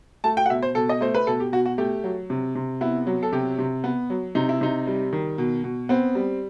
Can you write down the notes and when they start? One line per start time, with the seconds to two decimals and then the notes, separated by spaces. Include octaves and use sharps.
0.24 A3 A5
0.37 G5
0.46 F#5
0.50 B2 E5
0.63 C5
0.75 B2 A4
0.89 D#5
1.01 A3 C5
1.15 B4
1.27 B2 A4
1.40 G4
1.52 B2 F#4
1.66 F#4
1.78 A3 G4
2.04 F#3
2.30 C3
2.55 C3
2.81 B3 E4
3.07 F#3
3.23 A4
3.32 C3 G4
3.59 C3
3.84 B3
4.10 F#3
4.35 C3 D#4
4.49 E4
4.61 C3 D#4
4.87 G3
5.13 D#3
5.38 B2
5.64 B2
5.89 B3 C4
6.15 G3